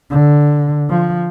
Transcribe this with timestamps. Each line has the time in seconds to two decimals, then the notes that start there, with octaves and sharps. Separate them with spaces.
0.11 D3
0.90 F3